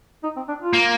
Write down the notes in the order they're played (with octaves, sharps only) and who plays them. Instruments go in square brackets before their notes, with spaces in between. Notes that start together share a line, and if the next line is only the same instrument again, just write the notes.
[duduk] D#4
C4
D4
F4
[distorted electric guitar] A#3